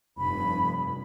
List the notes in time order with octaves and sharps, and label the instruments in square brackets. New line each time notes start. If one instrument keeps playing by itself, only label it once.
[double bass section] F1 G2 [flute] B5